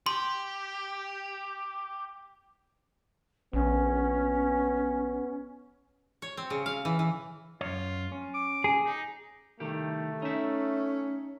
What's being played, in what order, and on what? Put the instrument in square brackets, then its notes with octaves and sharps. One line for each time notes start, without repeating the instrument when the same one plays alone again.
[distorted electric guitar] G4 [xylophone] C6
[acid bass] A#1 [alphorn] B3 [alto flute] C#4
[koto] C#5
C4
C#3
F5
E3
E3
[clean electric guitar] F#2 C#5 [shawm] F4
[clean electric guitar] C#4
[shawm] D6
[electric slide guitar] G#4
[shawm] D#4
[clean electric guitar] C2 D#3 G4 [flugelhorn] A3
[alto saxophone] C#4 [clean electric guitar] D#4 E5